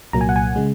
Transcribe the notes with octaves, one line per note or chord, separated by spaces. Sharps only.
C2 A#2 F#3 A#3 A#5
G#5
F#5
G#5
C#3 G#3